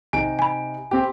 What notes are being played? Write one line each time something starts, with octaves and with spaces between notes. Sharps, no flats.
C3 D#4 G#5 D7
G#5 B5
C4 G4